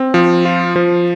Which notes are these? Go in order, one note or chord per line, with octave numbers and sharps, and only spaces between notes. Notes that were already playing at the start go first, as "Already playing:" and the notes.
Already playing: C4
F3
F4
F3